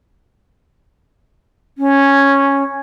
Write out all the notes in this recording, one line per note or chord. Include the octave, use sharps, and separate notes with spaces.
C#4